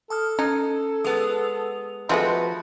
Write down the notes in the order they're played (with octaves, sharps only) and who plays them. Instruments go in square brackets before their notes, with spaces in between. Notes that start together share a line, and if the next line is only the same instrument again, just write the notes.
[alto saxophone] A4 [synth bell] A5 D#6 F6
[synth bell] C#4 [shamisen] D#4
[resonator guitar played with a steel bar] G#3 B3 [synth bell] D#6 F7
[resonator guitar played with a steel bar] F3 F#4 [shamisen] G#3 A3 C4 [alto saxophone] B4 [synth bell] D#5